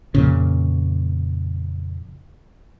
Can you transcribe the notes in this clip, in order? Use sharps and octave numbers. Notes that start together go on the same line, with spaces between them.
F2 A#2 C#3